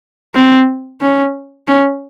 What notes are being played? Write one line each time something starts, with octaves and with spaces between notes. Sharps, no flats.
C4
C#4
C#4